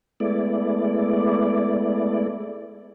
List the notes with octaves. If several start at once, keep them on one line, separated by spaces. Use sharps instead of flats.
G#3 A3 B3 E4 D5